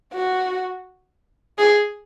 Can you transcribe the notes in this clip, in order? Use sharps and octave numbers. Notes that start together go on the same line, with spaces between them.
F#4
G#4